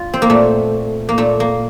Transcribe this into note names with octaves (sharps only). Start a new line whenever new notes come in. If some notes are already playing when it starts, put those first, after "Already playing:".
Already playing: F4
C4
A#3
A#2 A3
A#3
A#2 A3
A#3